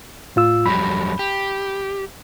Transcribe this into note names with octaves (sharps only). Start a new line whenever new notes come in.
A2 F4 E6
F2 F#3 G3 B5
G4